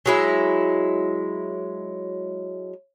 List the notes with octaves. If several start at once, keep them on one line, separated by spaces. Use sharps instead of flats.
F#3 G#3 E4